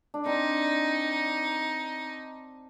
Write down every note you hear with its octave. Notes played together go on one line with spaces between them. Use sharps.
D4
C4 D#4